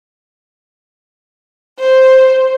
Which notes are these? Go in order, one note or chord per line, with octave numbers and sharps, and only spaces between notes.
C5